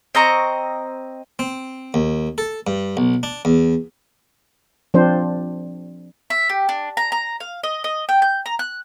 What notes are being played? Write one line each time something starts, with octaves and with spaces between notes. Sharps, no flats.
C4 D#5 A#5 C#6
C4
D#2
A4
G2
B1
D4
E2
F3 C4 D4 C5
E5
G4
D4
A#5
A#5
F5
D#5
D#5
G5
G6
A#5
F#6